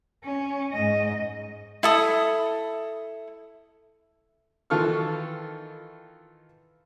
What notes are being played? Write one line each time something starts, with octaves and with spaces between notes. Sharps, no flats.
C#4
G#2 D#5
E4 A4 D#6
D#3 E3 F4 A4 C#6 F6